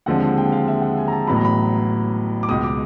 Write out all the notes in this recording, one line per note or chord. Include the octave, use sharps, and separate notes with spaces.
D#2 D3 F3 G#3 C4 F#5
G5
F5
F5
E5
F#5
G#5
A#5
A5
A1 A2 F#3 B3 B5
A#5
B5
D6
C#2 B2 G#3 D#6
D6